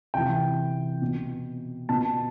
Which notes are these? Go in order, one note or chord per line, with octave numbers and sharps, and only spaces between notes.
C3 E3 G5
B2
B2 A5